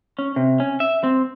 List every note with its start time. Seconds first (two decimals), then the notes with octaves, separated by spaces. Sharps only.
0.19 C#4
0.36 C3
0.60 C#4
0.80 E5
1.04 C4